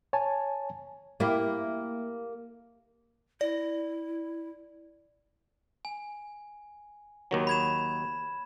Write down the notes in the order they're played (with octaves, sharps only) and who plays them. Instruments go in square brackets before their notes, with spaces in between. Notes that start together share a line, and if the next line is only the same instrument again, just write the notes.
[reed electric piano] C#5 G#5 A5
[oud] A#3 E4 G4
[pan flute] E4 [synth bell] D5
[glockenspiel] G#5
[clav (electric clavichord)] D#2 D#3 F#3
[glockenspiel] B5 G#6 E7